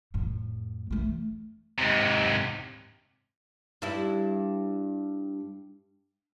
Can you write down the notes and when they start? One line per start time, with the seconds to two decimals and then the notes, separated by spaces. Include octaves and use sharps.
0.14 F2 A2
0.91 E3 A3
1.78 G#2 C3
3.82 G2 E4